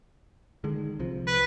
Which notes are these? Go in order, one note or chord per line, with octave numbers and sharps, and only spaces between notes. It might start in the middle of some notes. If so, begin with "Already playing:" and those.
D3 D#3 G#3
C2 C3 F3
B4